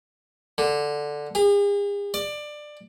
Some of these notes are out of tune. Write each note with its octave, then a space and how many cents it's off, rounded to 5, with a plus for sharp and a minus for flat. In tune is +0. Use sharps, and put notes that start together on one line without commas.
D3 +0
G#4 -45
D5 +20